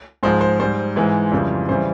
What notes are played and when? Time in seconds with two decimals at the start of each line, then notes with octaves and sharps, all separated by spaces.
0.23 G#2 F3 G#3 C5
0.41 C5
0.59 G#2 G3 C5
0.96 G#2 E3 G#3
1.32 F2 C#3 E3 G3
1.69 C#3 E3 G3 C5